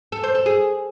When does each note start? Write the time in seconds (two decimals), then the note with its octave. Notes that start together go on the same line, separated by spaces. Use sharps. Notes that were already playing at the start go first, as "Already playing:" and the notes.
0.12 A4
0.24 C5
0.35 A4
0.46 G#4